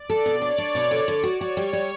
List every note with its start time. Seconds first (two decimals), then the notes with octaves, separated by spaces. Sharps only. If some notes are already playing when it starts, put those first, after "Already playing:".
Already playing: D5
0.10 A4
0.26 B2
0.42 D4 C#5
0.58 D4
0.75 B2
0.91 D3
1.08 D3
1.24 F#4
1.41 F#4 C#5
1.57 G3
1.73 G3